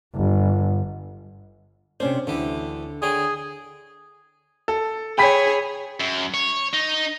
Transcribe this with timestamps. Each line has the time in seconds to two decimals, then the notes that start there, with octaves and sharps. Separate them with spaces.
0.15 G1
2.00 C3 C#4 D4 C5
2.27 D2 D3 E3 G4
3.02 D3 G#4 C#5 G5
4.68 A4
5.18 G#4 C#5 G5 B5 B6
6.00 F#2
6.34 C#5
6.74 D#4